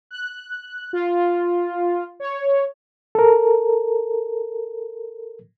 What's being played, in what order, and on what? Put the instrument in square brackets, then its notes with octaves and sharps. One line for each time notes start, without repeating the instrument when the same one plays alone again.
[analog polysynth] F#6
F4
C#5
[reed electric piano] A4 A#4